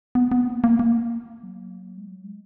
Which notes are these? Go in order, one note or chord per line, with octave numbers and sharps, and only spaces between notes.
B3
B3
A#3
A#3
A#3
F#3
G#3
F#3
G#3